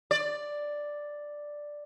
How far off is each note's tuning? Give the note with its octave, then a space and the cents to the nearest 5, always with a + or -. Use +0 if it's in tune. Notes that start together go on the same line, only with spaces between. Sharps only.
D5 +5